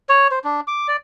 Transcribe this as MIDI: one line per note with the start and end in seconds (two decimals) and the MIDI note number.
0.09 0.28 73
0.31 0.39 72
0.44 0.61 62
0.67 0.87 86
0.88 0.96 74